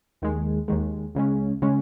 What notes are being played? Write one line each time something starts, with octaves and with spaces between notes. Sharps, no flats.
D#2 D#3 G#3
D#2 D#3 G#3
C#2 C#3 G#3 C#4
C#3 G#3 C#4